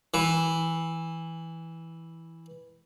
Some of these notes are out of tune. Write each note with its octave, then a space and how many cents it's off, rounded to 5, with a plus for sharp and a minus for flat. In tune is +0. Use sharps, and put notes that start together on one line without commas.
E3 -5